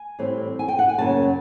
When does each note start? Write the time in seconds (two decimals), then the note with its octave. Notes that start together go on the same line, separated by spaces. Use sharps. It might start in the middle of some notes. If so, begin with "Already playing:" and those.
Already playing: G#5
0.19 A2 E3 G3 C4
0.59 G#5
0.68 G5
0.79 F#5
0.89 G#5
0.98 F#2 C#3 F#3 A#3 C#4 A5